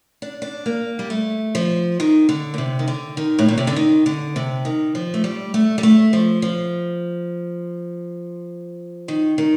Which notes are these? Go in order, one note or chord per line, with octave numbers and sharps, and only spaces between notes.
D4
D4
A#3
G3
A3
F3
D#3
D3
A#2
C3
D#3
D3
D#3
A2
A#2
C3
D3
D#3
D3
C3
D#3
F3
A3
G3
A3
G3
A3
F3
F3
D#3
D#3